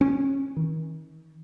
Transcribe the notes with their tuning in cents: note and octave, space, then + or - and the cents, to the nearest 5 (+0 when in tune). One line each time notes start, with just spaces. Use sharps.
C#4 -20
D#3 +40